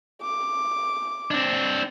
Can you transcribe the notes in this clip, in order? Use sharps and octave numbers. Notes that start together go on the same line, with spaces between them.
D6
C4 D4